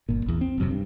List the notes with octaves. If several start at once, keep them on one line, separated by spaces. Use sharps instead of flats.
G1 A#2
A#1 E2
C4
D#1 F#2 C3
G2